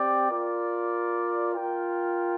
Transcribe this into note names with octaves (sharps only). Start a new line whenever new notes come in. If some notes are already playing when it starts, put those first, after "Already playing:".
Already playing: C4 G4 D5 G5
F4 A#4 D5
F4 A#4 G5